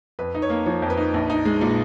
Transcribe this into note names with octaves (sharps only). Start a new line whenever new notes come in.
F2 B4
D#4
C#5
A#3
F3 C#5
F2
B4
D#4
A#1
D#4
G#3
A#2